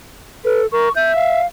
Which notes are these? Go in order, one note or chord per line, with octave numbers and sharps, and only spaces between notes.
A4 B4
A#4 C#6
E5 G6
F5